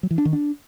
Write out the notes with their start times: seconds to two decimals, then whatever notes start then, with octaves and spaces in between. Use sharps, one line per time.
0.03 F#3
0.11 E3
0.18 D4
0.25 D#3
0.33 D4